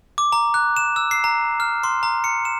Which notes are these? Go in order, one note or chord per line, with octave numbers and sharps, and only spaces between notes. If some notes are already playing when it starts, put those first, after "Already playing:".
D6
A#5
F#6
E7
E6
C7
A#5
F6
C6
A#5
C#7
E7